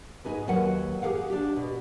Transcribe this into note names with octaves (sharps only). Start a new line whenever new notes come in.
G#2 D#4 G#4 B4
D#2 F#3 B4 F#5
G4 G#4 A#4 F5 F#5
D4 G4
B2